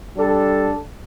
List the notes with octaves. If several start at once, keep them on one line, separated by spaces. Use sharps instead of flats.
G3 D4 A4